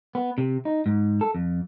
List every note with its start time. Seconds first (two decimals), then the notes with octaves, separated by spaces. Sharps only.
0.15 B3
0.38 C3
0.65 D#4
0.86 G#2
1.21 A4
1.35 F2